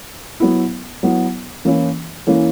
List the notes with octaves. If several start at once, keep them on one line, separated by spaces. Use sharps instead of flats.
F#3 B3 E4
F#3 B3 E4
E3 A#3 C#4 E4
E3 A#3 C#4 E4